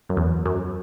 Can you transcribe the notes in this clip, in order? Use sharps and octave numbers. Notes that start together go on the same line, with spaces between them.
F#2
E2
F#2